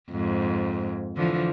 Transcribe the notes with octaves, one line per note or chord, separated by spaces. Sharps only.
F2 G#2
D3 E3 F3